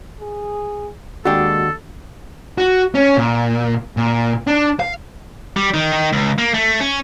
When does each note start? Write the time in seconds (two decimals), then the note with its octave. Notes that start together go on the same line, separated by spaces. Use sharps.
0.21 G#4
1.25 D#2 G#3 D4 F#4 G4 A4
2.58 F#4
2.95 C#4
3.17 A#2
3.97 A#2
4.47 D4
4.80 F5
5.56 G3
5.74 D#3
5.93 D#3
6.13 C#2
6.38 A#3
6.54 A3
6.80 C#4